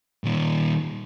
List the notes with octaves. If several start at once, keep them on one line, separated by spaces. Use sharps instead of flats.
A#2 D#3